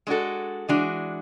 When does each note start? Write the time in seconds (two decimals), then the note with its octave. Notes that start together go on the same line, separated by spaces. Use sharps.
0.07 G#3 D4 F#4 A4
0.69 E3 G#3 D4 F#4